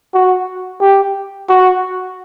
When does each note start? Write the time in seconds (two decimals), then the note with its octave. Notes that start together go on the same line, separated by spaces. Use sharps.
0.14 F#4
0.81 G4
1.49 F#4